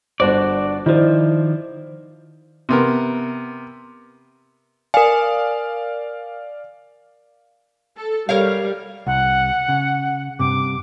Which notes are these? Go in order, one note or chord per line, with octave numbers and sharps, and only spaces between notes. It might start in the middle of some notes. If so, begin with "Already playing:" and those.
G1 D4 F#4 C5 D5
D#3 F3 E4 C5 D5
C3 B3 A#4
A#4 D5 F5 G#5
A4
G3 A#4 C#5 F5
C2 F#5
C#3
G2 C3 D6